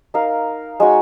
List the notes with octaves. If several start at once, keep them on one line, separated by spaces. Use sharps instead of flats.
D#4 A#4 F5
G#3 D#4 F#4 C#5